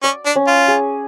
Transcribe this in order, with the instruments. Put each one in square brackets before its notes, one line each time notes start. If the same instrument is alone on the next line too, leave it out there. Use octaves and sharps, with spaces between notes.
[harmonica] C#4 [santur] D5
[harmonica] D4
[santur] C#4
[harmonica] F4
[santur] G#4